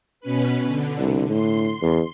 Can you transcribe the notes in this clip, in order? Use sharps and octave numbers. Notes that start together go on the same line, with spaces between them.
B2 C#4 B4
D3
C2
A2 C6
E2